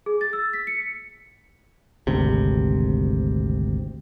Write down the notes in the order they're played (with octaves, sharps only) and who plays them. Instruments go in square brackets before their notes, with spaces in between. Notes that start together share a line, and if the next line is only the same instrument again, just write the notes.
[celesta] G#4
A6
E6
B6
C#7
[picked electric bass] G#1 D2 C3